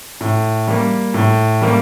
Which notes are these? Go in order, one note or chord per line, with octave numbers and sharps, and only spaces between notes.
A2
G3 A#3
A2
G3 A#3